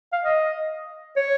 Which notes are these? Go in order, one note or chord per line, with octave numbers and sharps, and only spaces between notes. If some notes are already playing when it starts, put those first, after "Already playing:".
F5
D#5
C#5